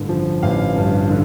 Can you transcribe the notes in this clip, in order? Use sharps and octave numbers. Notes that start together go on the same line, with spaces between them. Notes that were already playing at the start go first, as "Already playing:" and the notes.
Already playing: A1 G2 D3
F3
A1 F5
G2
D3